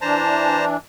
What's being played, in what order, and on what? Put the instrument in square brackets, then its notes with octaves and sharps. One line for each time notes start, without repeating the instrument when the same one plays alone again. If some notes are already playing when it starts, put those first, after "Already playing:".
[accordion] E3 D4 [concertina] C5 A5 A#5